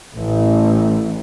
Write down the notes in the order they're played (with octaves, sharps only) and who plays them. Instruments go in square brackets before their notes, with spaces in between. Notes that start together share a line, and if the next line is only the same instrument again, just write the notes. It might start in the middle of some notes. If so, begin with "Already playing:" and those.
[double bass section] A1